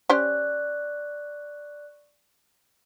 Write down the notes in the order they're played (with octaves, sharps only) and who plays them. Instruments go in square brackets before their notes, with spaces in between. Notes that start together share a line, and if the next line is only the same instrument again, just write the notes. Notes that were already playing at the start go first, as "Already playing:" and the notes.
[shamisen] C#4 G4 C5 [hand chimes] D5 C#6 F#6